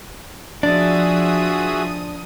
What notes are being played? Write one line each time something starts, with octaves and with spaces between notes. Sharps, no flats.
F3 D4 F#4 G#4 E5 D#6